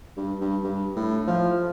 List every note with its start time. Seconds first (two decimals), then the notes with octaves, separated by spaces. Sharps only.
0.17 G2
0.41 G2
0.64 G2
0.96 A2
1.27 F3